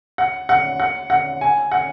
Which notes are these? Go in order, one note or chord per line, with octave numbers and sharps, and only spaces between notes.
F#5
F#5
F#5
F#5
G#5
F#5